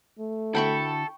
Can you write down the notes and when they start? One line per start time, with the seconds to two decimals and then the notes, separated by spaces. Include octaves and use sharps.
0.19 A3
0.55 D3 E4 F#4 A4 G5 B5 C#6